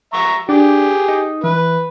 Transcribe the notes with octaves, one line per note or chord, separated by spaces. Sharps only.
E5 A#5 C#6
D4 G4 G#4
D#4
E3 B4